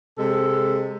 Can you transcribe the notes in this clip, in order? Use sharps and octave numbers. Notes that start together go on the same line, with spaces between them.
C3 G#3 A4